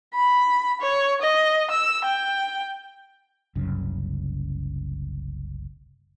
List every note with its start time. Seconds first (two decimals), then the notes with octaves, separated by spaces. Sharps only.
0.15 B5
0.82 C#5
1.22 D#5
1.71 E6
2.05 G5
3.55 F#1 C2 F#2 C#3